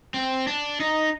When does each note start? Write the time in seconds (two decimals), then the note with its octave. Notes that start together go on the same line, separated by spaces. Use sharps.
0.14 C4
0.47 D4
0.80 D#4